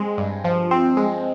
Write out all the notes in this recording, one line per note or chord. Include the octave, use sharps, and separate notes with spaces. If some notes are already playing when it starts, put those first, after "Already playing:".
Already playing: G#3 C4
G2
F3
C4
G#3